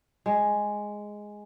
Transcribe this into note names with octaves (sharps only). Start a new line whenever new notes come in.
G#3